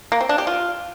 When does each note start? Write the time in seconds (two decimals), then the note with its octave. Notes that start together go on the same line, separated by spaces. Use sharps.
0.12 A#3
0.21 C4
0.29 D4
0.38 G4
0.47 F4